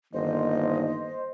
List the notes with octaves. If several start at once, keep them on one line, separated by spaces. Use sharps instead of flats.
G1 D#3 A#3 C5 D#5